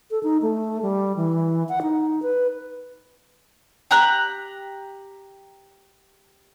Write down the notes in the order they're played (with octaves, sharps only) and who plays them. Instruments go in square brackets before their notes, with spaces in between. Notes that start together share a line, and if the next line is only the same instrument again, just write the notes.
[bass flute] A4
D#4
A3
G3
E3
F#5
D#4
B4
[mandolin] G4 A#5 F#6